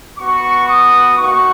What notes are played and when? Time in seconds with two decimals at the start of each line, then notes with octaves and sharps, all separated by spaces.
0.18 B3 F#4 C#6
0.68 D#6
1.17 A#3 D#4 F#4 C#6